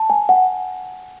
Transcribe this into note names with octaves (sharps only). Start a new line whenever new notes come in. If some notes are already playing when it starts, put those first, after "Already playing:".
Already playing: A5
G#5
F#5